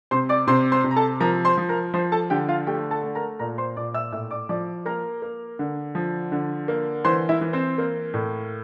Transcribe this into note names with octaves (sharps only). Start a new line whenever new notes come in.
C3 C5 C6
D5 D6
C3 C5 C6
C5 C6
C3
A#5
A4 A5
F3 A#4 A#5
C5 C6
F3
A#4 A#5
F3 C5 C6
A4 A5
D3 G4 G5
F4 F5
A3 G4 G5
A4 A5
A3
A#4 A#5
A#2 A#4 A#5
C5 C6
A#2 D5 D6
E5 E6
A2 E5 E6
D5 D6
F3 D5 D6
A#3 A#4 A#5
A#3
D3
F3
D3
A#3
E3 C5 C6
E4 E5
E3
C4 C5
A#3
A2